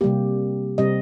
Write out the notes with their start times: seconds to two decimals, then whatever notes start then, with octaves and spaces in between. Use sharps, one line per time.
0.01 C3 G3 A#3 G4
0.78 C3 G3 C4 D#5